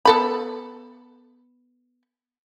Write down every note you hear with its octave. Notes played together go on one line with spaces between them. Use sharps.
B3 A4 B5